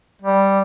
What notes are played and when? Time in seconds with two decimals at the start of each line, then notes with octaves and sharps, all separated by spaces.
0.22 G3